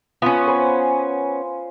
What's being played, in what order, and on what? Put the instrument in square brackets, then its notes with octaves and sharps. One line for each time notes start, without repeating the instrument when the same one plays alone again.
[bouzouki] B3 C#4 [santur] F4
[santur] C5 G#5 B5